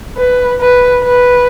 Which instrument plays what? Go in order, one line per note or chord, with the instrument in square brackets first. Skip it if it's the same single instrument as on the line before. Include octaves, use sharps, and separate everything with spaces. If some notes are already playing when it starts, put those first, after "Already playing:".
[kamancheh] B4
B4
B4